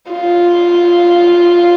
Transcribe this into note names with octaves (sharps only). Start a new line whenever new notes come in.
F4